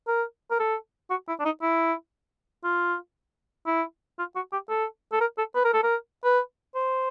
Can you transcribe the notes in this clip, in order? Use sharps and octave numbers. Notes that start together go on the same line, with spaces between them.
A#4
A#4
A4
F#4
E4
D4
D#4
E4
F4
E4
F4
F#4
G4
A4
A4
A#4
A4
B4
A#4
A4
A#4
B4
C5